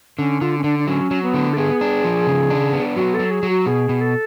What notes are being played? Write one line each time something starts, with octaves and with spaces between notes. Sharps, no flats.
D3 C#4
D3 F4
C#4
D3 D4
D4
F#3 C#4
F#3
B3
D3
A4
B3 G#4
D4
F3
C#3
D4
B3
F#3 F#4
A4
F#3
G#4
F#3
F#4
B2 G#4
B2
A4